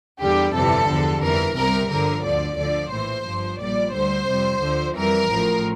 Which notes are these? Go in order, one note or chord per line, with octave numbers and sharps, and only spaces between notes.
E2 D3 G3 G4
G1 F2 C3 E3 G3 A4
E2 D3 F3
G1 F2 E3 A#4
C2 C3 G3 A#4
G1 G2 D3 F3 A#4
D2 D3 F3 D5
D2 D3 F3 D5
A#1 A2 E3 C5
G1 G2 F3
A#1 A#2 G3 D5
D2 D3 G3 C5
F2 C3 G3
D2 D3 F3
F2 E3 G3 A#4
A1 A2 F3